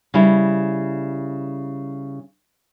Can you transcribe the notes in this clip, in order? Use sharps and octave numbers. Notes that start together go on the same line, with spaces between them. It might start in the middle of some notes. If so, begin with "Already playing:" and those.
C#3 G3 E4